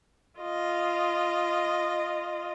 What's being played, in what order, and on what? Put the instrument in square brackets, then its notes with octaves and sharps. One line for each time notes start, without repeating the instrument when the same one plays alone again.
[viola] F4 D#5